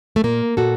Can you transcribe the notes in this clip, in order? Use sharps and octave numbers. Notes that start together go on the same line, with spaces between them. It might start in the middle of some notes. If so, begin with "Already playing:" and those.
A3
A#2 A#3
A#2 F#4 A4